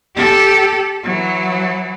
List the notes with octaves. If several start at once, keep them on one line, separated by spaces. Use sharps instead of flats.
G4 A4
E3 F#3